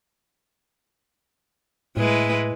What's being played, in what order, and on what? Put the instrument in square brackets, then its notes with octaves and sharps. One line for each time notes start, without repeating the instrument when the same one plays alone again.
[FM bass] A2 [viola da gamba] G#3 E4 B4